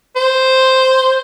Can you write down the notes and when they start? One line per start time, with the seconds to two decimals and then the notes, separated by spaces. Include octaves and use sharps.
0.16 C5